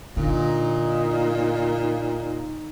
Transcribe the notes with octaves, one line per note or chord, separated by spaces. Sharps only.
A#2 D3 D#4